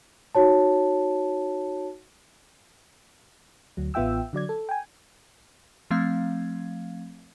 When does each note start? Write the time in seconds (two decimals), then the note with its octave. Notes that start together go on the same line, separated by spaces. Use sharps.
0.35 D#4 F#4 C#5 A5
3.77 D2 F#3
3.94 A1 B3 F4 E5 G5 E6
4.33 D3 F#3 D5 G#6
4.49 A4
4.69 G5 G#5
5.91 F3 A3 C4 F5 G#6